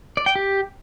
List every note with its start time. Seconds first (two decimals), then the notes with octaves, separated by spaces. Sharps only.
0.17 D5
0.26 G5
0.35 G4